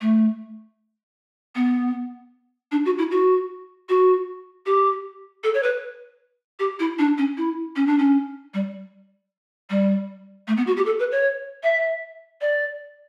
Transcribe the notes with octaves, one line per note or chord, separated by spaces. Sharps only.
A3
B3
D4
F#4
E4
F#4
F#4
G4
A4
C#5
B4
G4
E4
D4
C#4
E4
C#4
D4
C#4
G3
G3
A3
B3
F#4
G4
A4
B4
C#5
E5
D5